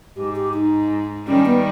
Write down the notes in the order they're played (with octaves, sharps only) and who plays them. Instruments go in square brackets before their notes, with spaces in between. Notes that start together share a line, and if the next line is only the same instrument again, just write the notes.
[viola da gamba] G#2 [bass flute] G4
[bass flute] G4
D#4
[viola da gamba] D#3 G3 [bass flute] C#4
[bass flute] B3